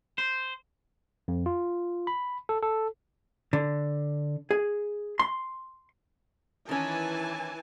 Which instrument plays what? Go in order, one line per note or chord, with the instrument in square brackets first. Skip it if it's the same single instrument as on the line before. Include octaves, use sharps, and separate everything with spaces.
[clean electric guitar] C5
[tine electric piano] F2
F4
B5
A4
A4
[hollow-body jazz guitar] D3
G#4
C6
[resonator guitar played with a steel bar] D#3 C#4 [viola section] E3 G#5 A5